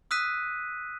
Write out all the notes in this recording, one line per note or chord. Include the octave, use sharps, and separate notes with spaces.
D#6 E6 F#6 B6 D#7